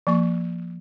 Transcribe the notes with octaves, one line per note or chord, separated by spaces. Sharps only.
F3 A#3 C#6